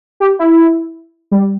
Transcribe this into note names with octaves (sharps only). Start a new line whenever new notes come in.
G4
E4
G3